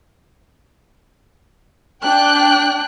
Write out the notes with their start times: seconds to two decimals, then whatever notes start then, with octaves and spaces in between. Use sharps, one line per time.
2.04 D4 G5 F#6